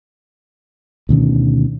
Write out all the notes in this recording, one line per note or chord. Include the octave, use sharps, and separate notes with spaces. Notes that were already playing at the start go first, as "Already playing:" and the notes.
D2 B2 D#3 C#4